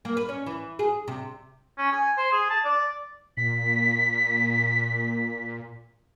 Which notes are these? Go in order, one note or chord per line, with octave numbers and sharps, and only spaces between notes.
A#3
B4
C#4
E3
G#4
C3
C#4
G#5
C5
G#4
A5
D5
A#2 B6